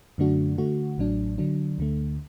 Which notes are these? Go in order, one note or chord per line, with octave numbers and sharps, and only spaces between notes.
F#2 D3 A3 D4 F#4
D3 A3 F#4
A1 A2 F#3 D4
D3 F#3 D4
D2 D3 A3